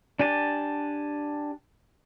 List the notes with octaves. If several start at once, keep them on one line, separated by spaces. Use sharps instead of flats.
D4 G4 G#5 A5